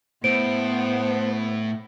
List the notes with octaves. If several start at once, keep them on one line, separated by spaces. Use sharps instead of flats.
A2 B3 C5 D7